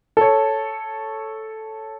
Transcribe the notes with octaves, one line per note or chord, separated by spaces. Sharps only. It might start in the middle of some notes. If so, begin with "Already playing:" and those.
A4 C#5